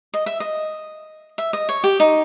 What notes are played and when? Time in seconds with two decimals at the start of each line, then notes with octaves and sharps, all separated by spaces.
0.14 D#5
0.26 E5
0.40 D#5
1.38 E5
1.53 D#5
1.69 C#5
1.84 G4
2.00 D#4